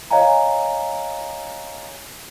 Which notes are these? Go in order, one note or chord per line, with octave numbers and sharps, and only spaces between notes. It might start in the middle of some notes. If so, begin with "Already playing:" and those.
C#5 D#5 F5 G#5 A#5